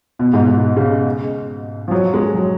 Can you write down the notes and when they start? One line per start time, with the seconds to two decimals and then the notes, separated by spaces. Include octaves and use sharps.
0.19 B2
0.34 G#2
0.48 G#2
0.77 C#3
1.88 F3
1.91 F#3
2.14 G#3
2.35 F#3